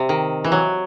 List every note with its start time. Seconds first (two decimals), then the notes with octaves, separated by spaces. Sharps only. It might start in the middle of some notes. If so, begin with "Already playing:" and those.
Already playing: C3 G3
0.09 D#3
0.44 E3
0.52 F#3